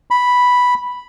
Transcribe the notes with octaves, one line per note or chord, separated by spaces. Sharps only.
B5